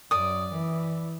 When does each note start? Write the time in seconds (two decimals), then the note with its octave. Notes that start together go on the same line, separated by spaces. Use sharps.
0.11 F#2 D5 D#6
0.52 E3